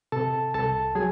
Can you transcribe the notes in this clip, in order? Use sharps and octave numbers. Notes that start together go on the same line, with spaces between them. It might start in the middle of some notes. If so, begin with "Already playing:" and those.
C3 A4 A5
C2 A4 A5
F#3 G#4 G#5